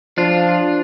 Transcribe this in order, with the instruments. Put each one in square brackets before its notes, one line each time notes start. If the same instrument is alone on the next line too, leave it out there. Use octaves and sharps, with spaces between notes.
[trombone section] F3 [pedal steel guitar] D4 F4